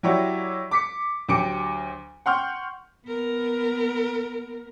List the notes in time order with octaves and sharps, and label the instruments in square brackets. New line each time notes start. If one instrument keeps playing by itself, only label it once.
[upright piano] F#3 E4 F#4 G4 C#5 D5
D6 B6 C#7
D2 F#3 G4 D6 C#7 D7
F#5 G5 C6 C#6 F6 G6
[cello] B3 A#4